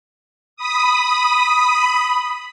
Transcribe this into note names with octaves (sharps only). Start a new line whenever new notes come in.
B5 D#6